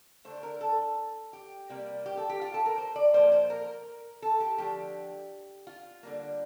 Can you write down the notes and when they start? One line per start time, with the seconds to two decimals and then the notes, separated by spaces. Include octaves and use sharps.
0.25 D3 A3 C5
0.43 A#4
0.61 A4
1.33 G4
1.70 C3 G3 A#3
2.06 G4
2.17 A4
2.30 G4
2.41 F4
2.54 A4
2.66 A#4
2.78 C5
2.96 D5
3.14 A#2 F3 A#3 C5
3.32 C5
3.50 A#4
4.22 A4
4.40 G4
4.58 D3 F3 A3 G4
5.67 F4
6.03 D3 G3 A#3